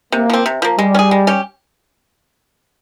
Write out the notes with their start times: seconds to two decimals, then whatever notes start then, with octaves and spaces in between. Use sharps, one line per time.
0.12 C3 A#3
0.30 F3 C4
0.46 C3
0.62 F3 A#3
0.78 G3 G#3
0.95 C#4
0.99 G#4
1.11 G#3
1.27 C#4 G4